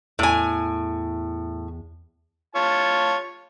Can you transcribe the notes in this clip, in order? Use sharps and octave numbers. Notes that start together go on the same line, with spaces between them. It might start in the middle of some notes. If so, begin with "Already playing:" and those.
E2 A2 G#5
F4 C#5 A5